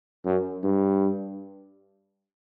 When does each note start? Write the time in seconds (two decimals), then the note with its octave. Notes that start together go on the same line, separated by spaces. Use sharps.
0.25 F#2
0.63 G2